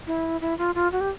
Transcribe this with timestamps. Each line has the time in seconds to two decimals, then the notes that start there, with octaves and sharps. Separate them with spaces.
0.07 E4
0.41 E4
0.58 F4
0.75 F4
0.92 F#4
1.01 G4